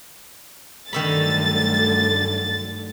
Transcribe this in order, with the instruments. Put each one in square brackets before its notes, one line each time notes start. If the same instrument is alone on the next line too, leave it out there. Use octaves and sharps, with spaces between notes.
[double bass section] G2 F#3 A3 [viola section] D3 [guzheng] D#3 E5 B5 [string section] A6